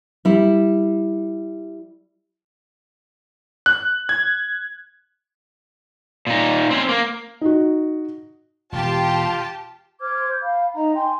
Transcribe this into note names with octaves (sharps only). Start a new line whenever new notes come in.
G3 E4
F#6
G#6
A#2 D#4
C4 C#4
A#3
D#4 F#4
E1 F4 G4 A5
C5 D6 F6 G#6
G6
F5 B5
D#4 D#5 E5 A#5
G5 G#5 C6